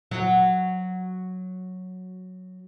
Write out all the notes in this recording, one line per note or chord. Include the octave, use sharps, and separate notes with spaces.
F#3 F#4